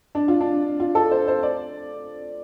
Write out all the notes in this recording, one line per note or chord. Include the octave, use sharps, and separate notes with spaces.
D4
F4
D4
F4
A4
C5
C5
D5